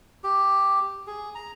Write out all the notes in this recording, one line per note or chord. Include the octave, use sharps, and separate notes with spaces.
G4
G#4
A#5